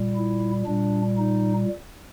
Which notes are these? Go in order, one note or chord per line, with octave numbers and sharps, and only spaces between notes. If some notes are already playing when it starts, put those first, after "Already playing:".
Already playing: A#2 G3
E4
A#2 G3 D4
D#4